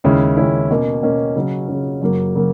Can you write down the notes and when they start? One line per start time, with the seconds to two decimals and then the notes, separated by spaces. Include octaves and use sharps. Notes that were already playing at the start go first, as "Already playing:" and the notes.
0.04 D#2 C#3 G#3 C#4 E4
0.37 D#2 C#3 G#3 C#4 E4
0.71 B2 A#3 C#4
1.03 B2 A#3 C#4
1.36 C#3 F#3 C#4
1.68 C#3 F#3 C#4
2.01 F#2 C#3 F#3 A#3
2.35 C#3 F#3 A#3